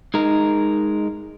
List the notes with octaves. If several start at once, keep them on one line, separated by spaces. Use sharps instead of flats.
G#3 D#4 A#4